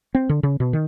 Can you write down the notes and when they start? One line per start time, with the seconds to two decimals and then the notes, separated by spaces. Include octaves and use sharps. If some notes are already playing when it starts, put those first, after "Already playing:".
0.15 C4
0.29 D3
0.43 C#3
0.60 B2
0.73 D#3